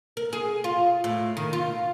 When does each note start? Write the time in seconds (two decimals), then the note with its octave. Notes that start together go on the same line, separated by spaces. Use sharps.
0.17 A#4
0.33 G#4
0.64 F4
1.04 A2
1.37 D#3
1.53 F4